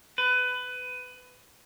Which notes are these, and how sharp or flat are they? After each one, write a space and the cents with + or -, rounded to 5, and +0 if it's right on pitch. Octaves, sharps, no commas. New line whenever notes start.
B4 +20